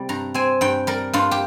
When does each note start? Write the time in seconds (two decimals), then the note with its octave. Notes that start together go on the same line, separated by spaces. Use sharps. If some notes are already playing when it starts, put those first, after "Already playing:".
Already playing: C3 G3 C4
0.09 G2 A#5
0.34 C4 G#5
0.61 G2 G5
0.87 G3 A#4
1.13 G2 F4
1.31 G4